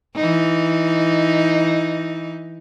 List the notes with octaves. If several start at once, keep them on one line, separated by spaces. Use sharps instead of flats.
E3 D#4